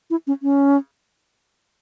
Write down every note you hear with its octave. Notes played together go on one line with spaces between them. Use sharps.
E4
C#4
C#4